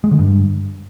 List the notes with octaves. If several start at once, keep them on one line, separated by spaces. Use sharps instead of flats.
G#3
D3
G2